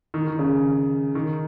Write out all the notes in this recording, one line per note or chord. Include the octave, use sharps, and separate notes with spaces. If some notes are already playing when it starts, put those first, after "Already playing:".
D#3
D#3
C#3
D#3